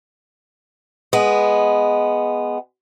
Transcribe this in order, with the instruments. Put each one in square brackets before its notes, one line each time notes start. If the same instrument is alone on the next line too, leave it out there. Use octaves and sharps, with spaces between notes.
[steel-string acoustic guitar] G#3 B3